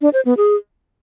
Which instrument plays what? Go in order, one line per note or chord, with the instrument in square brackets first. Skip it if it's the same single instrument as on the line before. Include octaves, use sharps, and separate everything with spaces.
[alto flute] D4
C5
B3
G#4